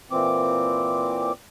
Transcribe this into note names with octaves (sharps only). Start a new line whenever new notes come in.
A#2 E3 C4 D6